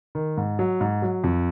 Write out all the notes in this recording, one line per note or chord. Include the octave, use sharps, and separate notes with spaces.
D#3
G#2
F#3
G#2
F#3
F2